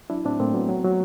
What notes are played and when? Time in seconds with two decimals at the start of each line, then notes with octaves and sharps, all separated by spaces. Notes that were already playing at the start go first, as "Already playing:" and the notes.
0.10 F#3 D4 E4
0.25 A2 C4 D4
0.40 A2 A#3 C4
0.54 F#3 A3 B3
0.69 F#3
0.85 F#3